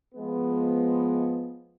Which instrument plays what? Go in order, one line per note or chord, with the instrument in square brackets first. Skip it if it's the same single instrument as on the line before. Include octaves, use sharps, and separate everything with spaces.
[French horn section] F3 G#3 B3